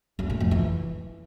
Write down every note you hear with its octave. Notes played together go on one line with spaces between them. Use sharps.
F#2
A2
F2
E3